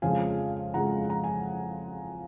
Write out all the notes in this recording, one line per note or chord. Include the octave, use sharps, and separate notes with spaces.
F2 C#3 F3 G#3 F5 G#5
F2 C#3 F3 G#3 F#5 A#5
A#5
G#5